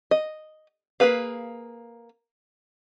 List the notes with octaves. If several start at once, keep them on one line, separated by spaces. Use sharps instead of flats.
D#5
A#3 C#4 G#4 B4 F5